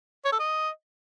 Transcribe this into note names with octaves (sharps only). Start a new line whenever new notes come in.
C#5
A4
D#5